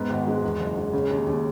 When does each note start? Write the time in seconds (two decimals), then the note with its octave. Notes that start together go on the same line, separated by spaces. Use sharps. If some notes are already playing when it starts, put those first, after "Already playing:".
Already playing: G#2 B3
0.10 G#1
0.27 G#3
0.43 E2
0.60 F#1
0.77 G#3
0.93 C#3
1.10 D#2
1.27 D#2